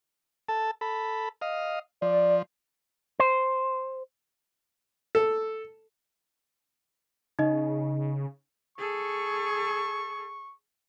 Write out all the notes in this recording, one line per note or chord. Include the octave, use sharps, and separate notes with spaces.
A4 A5
A4 B5
D#5 F5
F3 D5
C5
A4
C#3 D#4 D#5
G#4 A4 C#6